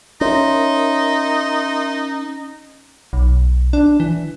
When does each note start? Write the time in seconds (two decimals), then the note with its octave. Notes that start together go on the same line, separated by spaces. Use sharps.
0.21 C#4 D#4 A#4 E5 C6
3.13 B1
3.73 D4
4.00 E3